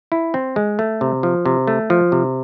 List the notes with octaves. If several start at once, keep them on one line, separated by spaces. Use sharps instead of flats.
E4
C4
G#3
A3
C3
F3
C3
A3
F3
C3